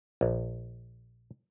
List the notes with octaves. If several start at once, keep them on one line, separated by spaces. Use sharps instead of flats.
A#1